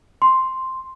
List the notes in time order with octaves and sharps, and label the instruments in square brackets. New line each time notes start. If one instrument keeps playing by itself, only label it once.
[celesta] C6